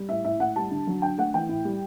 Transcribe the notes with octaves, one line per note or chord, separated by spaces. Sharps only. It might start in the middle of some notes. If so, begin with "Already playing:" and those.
Already playing: G3
A2 E5
A2 E5
A2 F#5
G3 A5
D3
F#3
D3 G5
A3 F#5
E3 G5
A2
G3